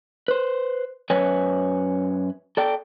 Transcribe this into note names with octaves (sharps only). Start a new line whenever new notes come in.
B4 C5
F#2 B4 C#5 G#5
A4 D5 G5